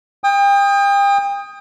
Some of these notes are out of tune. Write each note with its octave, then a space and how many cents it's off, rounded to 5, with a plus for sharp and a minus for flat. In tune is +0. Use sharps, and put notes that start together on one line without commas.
G5 +35 D#6 +0